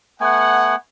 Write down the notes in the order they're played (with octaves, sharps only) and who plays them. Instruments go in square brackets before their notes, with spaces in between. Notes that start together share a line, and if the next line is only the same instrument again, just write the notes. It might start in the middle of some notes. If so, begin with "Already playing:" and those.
[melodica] A3 B3 G#5 [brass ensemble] F#5